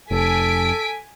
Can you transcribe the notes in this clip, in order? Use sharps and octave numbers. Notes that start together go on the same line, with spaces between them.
F1 A4 G#5 B6 D7